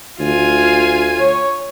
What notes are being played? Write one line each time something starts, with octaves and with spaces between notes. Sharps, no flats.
D2 F4 G#5
C#5